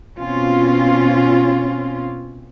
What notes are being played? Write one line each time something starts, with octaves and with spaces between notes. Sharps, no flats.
B2 C4 C#4 F4